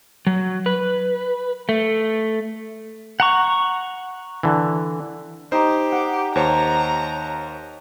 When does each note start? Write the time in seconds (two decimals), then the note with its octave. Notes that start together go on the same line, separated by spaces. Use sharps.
0.27 F#3
0.66 B4
1.69 A3
3.20 F#5 A#5 C#6
4.43 D3 E3
5.52 D#4 G4 C5
5.92 F#5
6.35 D#2 C5 C#5 A#5